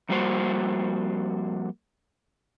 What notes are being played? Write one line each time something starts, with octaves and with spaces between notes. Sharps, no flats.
F2 G3 A#3 F#4 C5